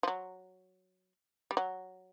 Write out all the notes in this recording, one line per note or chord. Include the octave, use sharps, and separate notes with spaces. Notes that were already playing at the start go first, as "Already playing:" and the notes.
F3
F#3
G3
F#3